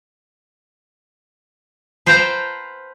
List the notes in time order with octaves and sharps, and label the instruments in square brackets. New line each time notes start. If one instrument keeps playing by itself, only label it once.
[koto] B4 C5 F5 G5 A5 A#5